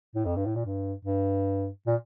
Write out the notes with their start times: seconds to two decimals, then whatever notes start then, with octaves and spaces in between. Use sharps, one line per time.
0.15 A2
0.25 F2
0.36 G2
0.46 A2
0.55 A#2
0.65 G2
1.05 G2
1.87 A#2